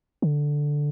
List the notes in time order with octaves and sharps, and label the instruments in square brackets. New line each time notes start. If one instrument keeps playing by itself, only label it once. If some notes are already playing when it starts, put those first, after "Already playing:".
[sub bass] D3